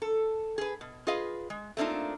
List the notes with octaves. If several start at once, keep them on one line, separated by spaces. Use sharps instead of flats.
A4
G#4 B4
B2
F4 G#4 B4 D#5 F5
G#3
A3 A#3 C4 D4 D#4 F4